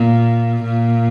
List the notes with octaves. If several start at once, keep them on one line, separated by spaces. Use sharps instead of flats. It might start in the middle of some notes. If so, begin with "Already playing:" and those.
Already playing: A#2
A#2